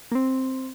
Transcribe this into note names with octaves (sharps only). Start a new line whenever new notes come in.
A#3
C4